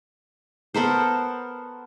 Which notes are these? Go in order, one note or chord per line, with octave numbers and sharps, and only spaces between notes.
B3 A4 A#4 C5